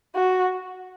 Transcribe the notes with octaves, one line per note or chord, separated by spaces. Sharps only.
F#4